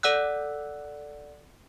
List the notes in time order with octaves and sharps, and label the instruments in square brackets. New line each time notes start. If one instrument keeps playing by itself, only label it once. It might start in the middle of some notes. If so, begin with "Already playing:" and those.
[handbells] A4 D5 F#5 E6 F#6